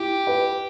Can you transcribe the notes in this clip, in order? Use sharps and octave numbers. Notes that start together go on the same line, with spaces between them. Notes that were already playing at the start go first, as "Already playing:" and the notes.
Already playing: E4 G4
B4